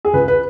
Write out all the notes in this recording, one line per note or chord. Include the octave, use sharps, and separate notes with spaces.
G#4
C#2 B4
B4